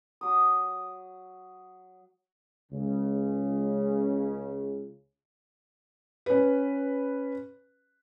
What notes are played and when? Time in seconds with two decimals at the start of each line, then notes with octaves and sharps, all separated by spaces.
0.21 F#3 D#6
2.72 C#2 C#3
6.26 C#4 B4